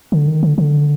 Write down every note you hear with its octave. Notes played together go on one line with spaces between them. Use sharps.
D3
D#3
D3
D3